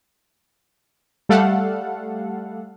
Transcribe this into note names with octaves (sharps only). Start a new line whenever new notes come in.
G3 A3 A4 F5 F#5